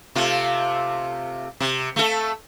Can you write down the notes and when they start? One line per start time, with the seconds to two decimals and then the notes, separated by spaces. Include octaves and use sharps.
0.15 C3 A3 F4
1.60 C3
1.96 A3 A4